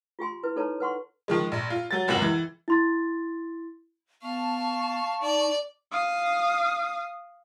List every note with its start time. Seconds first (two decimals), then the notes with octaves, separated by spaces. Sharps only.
0.19 F4 G4 G#5 C6
0.43 E4 B4
0.56 D#4 A4 B4 C#5 A5 A#5
0.80 B4 F#5 C6 C#6
1.28 D#3 F3 G#3
1.52 A#1
1.70 F4
1.91 F#3 A6
2.08 F#1 C#2 C3 F#5 F#7
2.22 E3
2.68 E4 C6 A6
4.23 B3 F5 A5 C#6
5.22 D#4 D5
5.92 F5 D#6